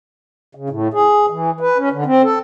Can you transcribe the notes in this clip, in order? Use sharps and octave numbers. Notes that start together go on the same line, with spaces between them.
C#3
A2
G#4
E3
B4
C#4
D3
C4
A4